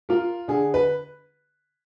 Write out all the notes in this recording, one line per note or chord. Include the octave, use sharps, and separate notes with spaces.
F4 A#4
D3 G#4
B4